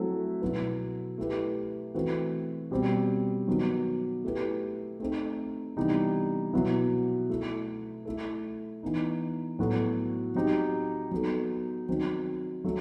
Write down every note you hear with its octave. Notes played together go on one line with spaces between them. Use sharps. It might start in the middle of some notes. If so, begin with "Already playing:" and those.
Already playing: F#3 A3 C4 E4 A4
B2 F#3 B3 E4 B4
A3 E4 G4 B4
E3 A3 C4 F#4 B4
B2 G3 C4
D#3 F#3 B3
A3 E4 G4 B4
A3 C4 D#4 A4
C3 E3 G3 B3 D#4
B2 F#3 B3 E4
A3 E4 A4
A3 E4 A4
E3 B3 D#4
A2 F#3 B3 F#4 A4
F#3 C4 D#4 G4
F#3 B3 D#4 A4
D#3 F#3 C4
F#3 A3